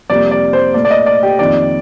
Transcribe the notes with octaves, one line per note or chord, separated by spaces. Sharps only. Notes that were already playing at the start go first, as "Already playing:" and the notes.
F2 C3 G3 A#3 D5
D5
C5
A#2 A3 D5
D5
D#5
D5
G4
F2 D#3 A#3 D5